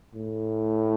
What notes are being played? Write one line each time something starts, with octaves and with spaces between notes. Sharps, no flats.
A2